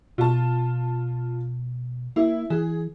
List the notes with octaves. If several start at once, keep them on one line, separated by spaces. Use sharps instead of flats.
B2 F4 A5
A#3 E4
E3 G#4